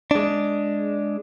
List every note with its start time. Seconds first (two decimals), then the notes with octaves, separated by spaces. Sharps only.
0.11 G#3 D4